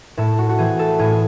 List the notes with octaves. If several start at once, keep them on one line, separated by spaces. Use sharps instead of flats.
A2 A4
F#4
F#4
E3 C4 G#4
A4
A2 G#4